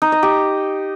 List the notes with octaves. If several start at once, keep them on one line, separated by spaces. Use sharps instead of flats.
D#4
D#5
G4